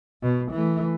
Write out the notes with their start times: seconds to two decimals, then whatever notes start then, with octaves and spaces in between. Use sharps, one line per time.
0.22 B2
0.51 E3 A3